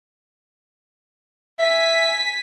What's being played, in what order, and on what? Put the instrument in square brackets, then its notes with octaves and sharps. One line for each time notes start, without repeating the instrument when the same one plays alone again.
[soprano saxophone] E5 [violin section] G#5 B6